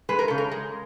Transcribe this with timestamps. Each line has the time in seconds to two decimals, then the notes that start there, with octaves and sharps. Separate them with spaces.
0.09 G#3 B4
0.19 A#4
0.28 C#3 A4
0.38 A#4
0.52 G#3